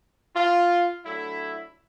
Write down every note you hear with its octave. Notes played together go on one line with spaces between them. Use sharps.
F4
F#3 A3 D4 E4